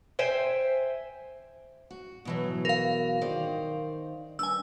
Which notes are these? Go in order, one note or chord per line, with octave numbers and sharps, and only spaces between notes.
C5 E5 G5 G#5
F#4
B2 E3 F#3
A#4 F5
D#3 C5 D5
G2 G#5 E6